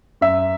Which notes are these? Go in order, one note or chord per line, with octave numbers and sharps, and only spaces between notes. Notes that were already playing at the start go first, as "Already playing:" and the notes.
F#2 E5